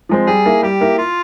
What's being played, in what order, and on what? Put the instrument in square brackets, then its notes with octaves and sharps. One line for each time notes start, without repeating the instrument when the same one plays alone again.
[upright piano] F3 G#3 C4
[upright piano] G3 [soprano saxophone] G#4
[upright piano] A#3 E4 A#4
[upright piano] G3 [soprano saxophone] G4
[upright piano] A#3 E4 A#4
[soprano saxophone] F4